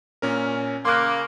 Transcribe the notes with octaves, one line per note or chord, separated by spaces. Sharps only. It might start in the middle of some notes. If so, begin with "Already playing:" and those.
A#2 C#4 A#4
C#3 A#3 C6 D6 F#6